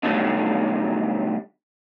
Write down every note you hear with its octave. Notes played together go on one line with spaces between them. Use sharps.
B2 D3 D#3 F#3 G3 A3